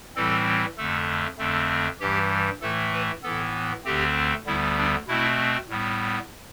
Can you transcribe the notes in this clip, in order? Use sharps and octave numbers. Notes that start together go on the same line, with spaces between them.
A2 E3 G3 C4 A4
F2 D3 A3 A4
F2 D3 A3 C4
G2 E3 G3 G4
A2 E3 A3 A4
B4
A2 E3 B3 A4
D2 D3 A3 C4 G4
D2 D3 G3 B3 E4
D4
B2 A3 C4 E4
A2 G3 B3